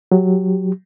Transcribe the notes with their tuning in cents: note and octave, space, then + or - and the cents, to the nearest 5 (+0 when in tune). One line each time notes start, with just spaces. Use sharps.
F#3 +0 G4 +0